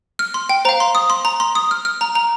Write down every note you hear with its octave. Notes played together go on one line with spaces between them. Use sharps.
F6
C6
G5
C5 F5 A#5
C6
D#6
C6
A#5
C6
D#6
F6
F6
A#5
A#5